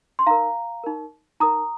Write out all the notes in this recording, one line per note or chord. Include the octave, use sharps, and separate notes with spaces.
C6
D#4 A#4 F5 A#5
D#4 A#4
D#4 A#4 A#5 D#6